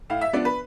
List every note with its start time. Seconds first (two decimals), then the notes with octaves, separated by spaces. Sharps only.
0.10 A2 F5
0.21 E5
0.33 F3 B3 D4 D5
0.45 B4